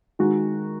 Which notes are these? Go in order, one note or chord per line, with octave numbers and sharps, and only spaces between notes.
D#3 G#3 F#4